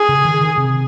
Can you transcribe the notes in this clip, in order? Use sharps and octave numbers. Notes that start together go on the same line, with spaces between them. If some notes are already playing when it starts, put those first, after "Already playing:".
Already playing: G#4
C#3
D#3
D#3
C3